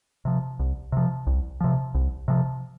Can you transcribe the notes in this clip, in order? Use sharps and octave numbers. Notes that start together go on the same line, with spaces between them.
C3 F3
C2
C3 F3
C2
C3 F3
C2
C3 F3